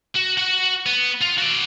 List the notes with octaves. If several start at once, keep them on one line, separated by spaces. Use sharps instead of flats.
F#4
F#4 F#5
B3
F4
F#4 D5